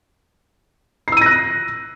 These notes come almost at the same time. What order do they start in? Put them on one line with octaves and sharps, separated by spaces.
C7 E6 D#7 A#6 F#6